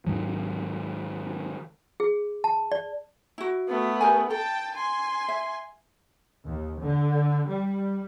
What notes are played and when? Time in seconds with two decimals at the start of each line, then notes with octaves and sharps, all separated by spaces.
0.07 G#2 D#3 F#3
2.00 G#4
2.44 A5
2.72 D5
3.38 E4 F#4
3.69 A3 B3
4.01 G4 A#4 G#5
4.30 A4 G5 A5
4.76 G#5 C6
5.28 E5
6.47 D#2
6.82 D3
7.48 G3